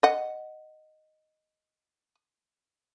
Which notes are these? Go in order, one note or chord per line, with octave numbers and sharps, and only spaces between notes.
D#5 F#5